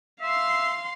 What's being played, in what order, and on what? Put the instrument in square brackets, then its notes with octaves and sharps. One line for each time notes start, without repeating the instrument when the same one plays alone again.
[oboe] E5 [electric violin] F5 C6